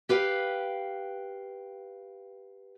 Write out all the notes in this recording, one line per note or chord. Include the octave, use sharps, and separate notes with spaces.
G4 B4 F5 G5